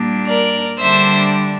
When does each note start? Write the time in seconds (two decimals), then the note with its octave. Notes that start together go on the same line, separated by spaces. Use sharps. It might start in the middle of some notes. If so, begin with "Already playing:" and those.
Already playing: A#2 G3 A#3 D4
0.27 A#4 D5
0.79 D3 G3 D4 C5 E5